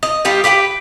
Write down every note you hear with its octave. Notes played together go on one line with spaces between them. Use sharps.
D#5
G3 D#4 F4 G4
G4 B4 F#5 G5